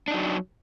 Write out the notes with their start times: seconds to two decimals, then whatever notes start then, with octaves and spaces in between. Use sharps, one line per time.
0.08 D4
0.11 D#4
0.14 F#3